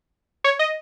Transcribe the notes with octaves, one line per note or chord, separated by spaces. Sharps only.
C#5
D#5